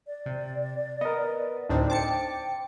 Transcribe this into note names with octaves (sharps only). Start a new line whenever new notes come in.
D5
C3
B3 A#4 D#5
D2 A2 C4 D4 D#4
C5 G5 A5 D6 A6 C#7